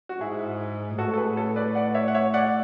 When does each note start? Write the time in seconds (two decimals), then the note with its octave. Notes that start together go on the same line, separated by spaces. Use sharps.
0.09 F#4
0.21 G#2 E4 G#4
0.98 A2 F#4 A4
1.13 A4
1.18 G#4 B4
1.37 A4 C#5
1.56 B4 D5
1.75 D5 F#5
1.95 C#5 E5
2.08 F#5
2.15 C#5 E5
2.34 D5 F#5